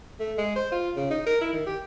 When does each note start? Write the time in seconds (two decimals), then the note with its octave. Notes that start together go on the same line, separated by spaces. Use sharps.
0.20 A3
0.38 G#3
0.56 C5
0.72 F4
0.96 C#3
1.11 D#4
1.27 A#4
1.41 E4
1.53 D#3
1.67 G4